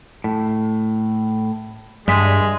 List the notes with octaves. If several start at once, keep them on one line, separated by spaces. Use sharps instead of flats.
A2
G2 G3 G#3 G#4 E5